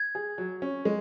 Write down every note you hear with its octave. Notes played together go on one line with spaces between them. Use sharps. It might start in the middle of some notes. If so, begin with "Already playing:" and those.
Already playing: G#6
G#4
F#3
C#4
G#3